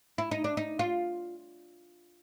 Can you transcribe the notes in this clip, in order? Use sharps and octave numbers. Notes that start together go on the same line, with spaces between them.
E4
D#4
D4
D#4
F4